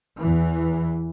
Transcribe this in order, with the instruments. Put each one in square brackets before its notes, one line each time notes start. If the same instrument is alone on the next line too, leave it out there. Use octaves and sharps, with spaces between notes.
[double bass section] E2 E3